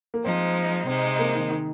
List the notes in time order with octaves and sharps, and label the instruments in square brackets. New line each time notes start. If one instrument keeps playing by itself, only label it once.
[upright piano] A#3
[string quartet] F3 G#3 D#4 [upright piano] C4
[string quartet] C3 G#3 D#4 [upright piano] C4
[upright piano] A#3
D#3
D#3